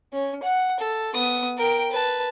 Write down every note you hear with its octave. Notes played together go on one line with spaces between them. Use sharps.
C#4
F#5
A4
B3 D#6
A#4 G5
B4 A5